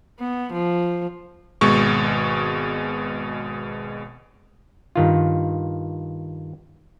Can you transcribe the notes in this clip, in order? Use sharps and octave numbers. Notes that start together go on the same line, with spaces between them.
B3
F3
G#1 B2 G#3 C#6
G2 D#3 F4